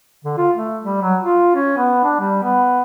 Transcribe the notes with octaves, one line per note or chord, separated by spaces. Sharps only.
D3
F4
A3
G3
F#3
F4
C#4
B3
D4
G3
B3